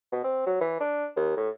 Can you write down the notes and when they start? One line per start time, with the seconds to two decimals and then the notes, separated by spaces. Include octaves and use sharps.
0.12 B2
0.24 C4
0.47 F#3
0.61 E3
0.80 D4
1.16 D#2
1.37 A2